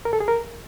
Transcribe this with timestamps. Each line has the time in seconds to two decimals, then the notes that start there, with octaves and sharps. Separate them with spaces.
0.05 A#4
0.13 A4
0.20 G#4
0.28 A#4